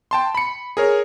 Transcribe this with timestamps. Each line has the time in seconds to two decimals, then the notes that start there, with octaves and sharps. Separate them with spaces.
0.11 G5 A5 C6
0.35 B5 C#7
0.77 G#4 A#4 C#5